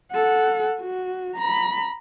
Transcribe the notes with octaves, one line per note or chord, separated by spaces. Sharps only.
A4 F#5
F#4
A#5 B5